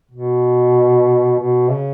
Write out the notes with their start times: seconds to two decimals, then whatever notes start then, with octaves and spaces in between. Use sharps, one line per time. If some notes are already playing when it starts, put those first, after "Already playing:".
0.11 B2
1.39 B2
1.71 C#3